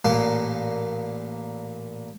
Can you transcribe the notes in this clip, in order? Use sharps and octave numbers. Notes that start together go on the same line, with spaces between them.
A1 A#2 A#3 C6